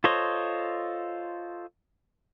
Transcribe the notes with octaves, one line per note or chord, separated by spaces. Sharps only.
F4 A4 C5 C#5 D#5